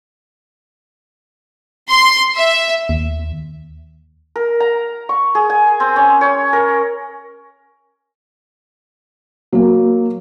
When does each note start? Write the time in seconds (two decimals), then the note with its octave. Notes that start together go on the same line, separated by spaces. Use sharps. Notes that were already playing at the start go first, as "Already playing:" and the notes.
1.89 C6
2.36 E5
2.89 D#2
4.36 A#4
4.60 A#5
5.09 C#6
5.35 G#4
5.50 G#5
5.80 C4
5.96 C#4
6.21 C#5
6.53 A#4
9.53 F#3 A#3